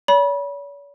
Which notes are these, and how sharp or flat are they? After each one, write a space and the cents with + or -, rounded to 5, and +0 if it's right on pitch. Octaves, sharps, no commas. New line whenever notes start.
C#5 +45 B5 -30